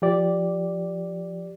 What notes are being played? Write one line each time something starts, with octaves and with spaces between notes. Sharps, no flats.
F3 G4 D5